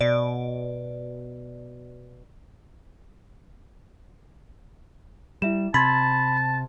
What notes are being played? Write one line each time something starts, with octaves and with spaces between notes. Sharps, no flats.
B2 D5
G3 E4 E5 E7
C3 A5 B5 C6 G#6 A6